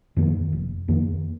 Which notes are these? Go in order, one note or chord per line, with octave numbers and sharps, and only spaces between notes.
F2 D#3 A#3
F1
F2 D#3 A#3